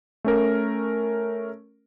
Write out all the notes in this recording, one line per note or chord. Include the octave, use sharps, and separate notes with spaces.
A3 C#4 A#4